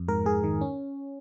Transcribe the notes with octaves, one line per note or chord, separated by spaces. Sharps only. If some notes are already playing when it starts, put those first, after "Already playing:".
Already playing: F2
G#2 A#4
G#2 G#4
D#3
C#4